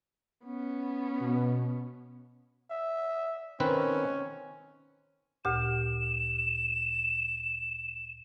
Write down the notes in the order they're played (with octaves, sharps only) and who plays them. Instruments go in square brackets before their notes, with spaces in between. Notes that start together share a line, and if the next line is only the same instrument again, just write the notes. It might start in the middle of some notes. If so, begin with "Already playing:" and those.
[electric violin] B3 C#4
[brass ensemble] B2
[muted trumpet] E5
[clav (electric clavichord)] D#3 C4 B4 [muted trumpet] C#4
[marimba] D2 A#2 G4 [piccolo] E7